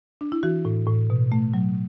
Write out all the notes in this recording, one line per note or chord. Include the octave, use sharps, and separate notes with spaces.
D4
E4
E3 F#4
A2
A2
B2
A3
F#3